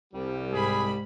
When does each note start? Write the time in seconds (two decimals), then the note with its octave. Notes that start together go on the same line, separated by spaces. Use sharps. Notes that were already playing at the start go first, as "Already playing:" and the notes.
0.13 C2 G3
0.52 G#2 G#4 B5